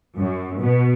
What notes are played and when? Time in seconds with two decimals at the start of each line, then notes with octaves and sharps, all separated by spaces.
0.16 F#2
0.60 B2